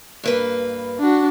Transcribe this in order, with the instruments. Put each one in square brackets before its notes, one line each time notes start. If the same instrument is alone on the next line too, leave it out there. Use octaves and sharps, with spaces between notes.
[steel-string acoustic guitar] G2 A#3 B4
[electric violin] D4 F#4